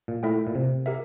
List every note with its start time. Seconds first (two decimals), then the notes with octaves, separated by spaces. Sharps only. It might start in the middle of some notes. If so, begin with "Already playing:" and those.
0.08 A#2
0.23 A3 E4 A4 E5 G5
0.47 A#2
0.55 C3
0.86 G4 A#4 E5